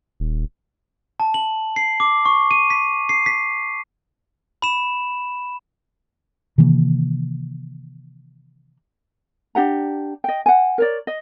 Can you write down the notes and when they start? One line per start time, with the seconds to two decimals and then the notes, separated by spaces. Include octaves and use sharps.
0.20 D#1
1.20 A5
1.34 F#7
1.76 C7
2.00 D6
2.26 C#6
2.51 D#7
2.70 B6
3.09 C7
3.26 B6
4.62 B5 E7
6.58 C3 D#3 E3 A#3
9.55 D4 G4 F#5 A#5
10.24 D#5 G5
10.46 F#5 G#5
10.78 A#4 C#5 D5
11.07 D#5